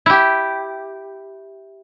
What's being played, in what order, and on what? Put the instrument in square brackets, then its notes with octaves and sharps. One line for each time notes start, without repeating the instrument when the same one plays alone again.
[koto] E4 G4